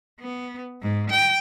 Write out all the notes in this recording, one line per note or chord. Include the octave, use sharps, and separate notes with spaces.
B3
G#2
G5